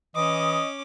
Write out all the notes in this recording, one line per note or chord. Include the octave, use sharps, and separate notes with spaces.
E3 C#4 D#5 D6 D#6